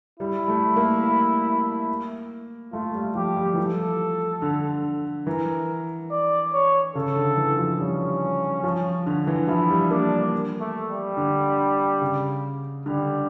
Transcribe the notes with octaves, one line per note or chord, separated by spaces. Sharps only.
G3 E4
A3
A#3
A3 F4
G3
F3 G4
G3
E3
F3 A4
D3
E3 A#4
D5
C#5
C#3 A4
D3
E3
F3
G3 C#4
F3
D3
E3
F3 E4
G3
A#3 D4
A3
G3
D3
C#3
D3 G3